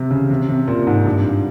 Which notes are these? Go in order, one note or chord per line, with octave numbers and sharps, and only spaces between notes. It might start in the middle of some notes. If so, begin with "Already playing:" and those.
Already playing: C3
C#3
C3
C3
A#2
G#2
G2